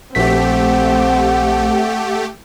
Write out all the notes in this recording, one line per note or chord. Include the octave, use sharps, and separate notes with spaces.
A#1 A3 C4 G4 F#5 B6